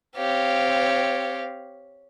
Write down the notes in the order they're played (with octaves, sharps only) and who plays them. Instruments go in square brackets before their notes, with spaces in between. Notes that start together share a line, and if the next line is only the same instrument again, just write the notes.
[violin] C4 F5 [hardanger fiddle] G4 C#5